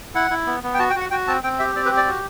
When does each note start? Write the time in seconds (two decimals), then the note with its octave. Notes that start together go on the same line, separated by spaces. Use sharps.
0.15 E4 F#5
0.31 E4
0.47 B3
0.63 B3
0.74 G5
0.79 F#4 A5
0.90 G5
0.96 F#4 F#5
1.11 F#4 G5
1.27 C4 A5
1.43 C4 G5
1.59 G4 E5
1.75 C4 D5
1.86 B4
1.91 G4
1.97 D5
2.07 F#4